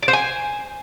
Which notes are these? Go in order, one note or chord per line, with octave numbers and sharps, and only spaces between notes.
D5
C5
G#5